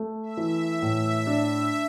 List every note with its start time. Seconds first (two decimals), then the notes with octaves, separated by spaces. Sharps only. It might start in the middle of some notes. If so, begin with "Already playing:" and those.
Already playing: A3
0.23 E5
0.37 E3
0.52 E5
0.82 A2 E5
1.27 D4